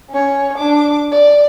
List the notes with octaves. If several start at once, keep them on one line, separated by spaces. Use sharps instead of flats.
C#4 C#5
D4 D6
D5